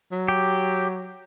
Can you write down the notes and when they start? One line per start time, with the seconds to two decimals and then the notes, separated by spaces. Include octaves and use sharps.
0.12 F#3
0.28 G4